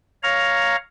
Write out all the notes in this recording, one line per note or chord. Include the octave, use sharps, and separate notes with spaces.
C#5 F5 A#5